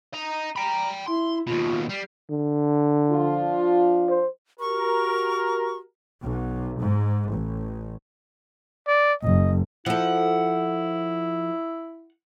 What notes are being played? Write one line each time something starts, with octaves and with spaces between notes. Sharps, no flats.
D#5 A#5
G5 A#5 B5
E4 C6
D#2 B2 F4
G3 C7
D3
F3 D4 F4
C5
F#4 G4 A#4 C#6
B1
G#2
A1
D5
F#1 D#5
F3 E4 A4 F#5